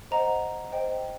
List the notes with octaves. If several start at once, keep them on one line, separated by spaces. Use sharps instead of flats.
C5 D#5 F#5 A#5
C5 D#5 G5